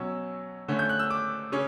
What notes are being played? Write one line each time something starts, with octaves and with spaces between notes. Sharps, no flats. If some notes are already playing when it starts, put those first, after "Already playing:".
Already playing: B2 F#3 C#4 E6
D3 A3 C#4
G6
F#6
E6
D6
C#3 C#4